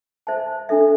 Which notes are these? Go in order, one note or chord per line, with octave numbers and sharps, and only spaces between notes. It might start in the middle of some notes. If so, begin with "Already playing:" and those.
C5 E5 A5
D4 A4 E5